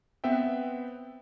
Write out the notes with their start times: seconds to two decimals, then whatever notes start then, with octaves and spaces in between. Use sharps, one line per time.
0.24 B3 C4 B4 E5 G5